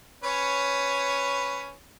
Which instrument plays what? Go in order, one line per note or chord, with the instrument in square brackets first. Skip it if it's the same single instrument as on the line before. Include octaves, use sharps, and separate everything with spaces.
[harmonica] C#4 B4 C#5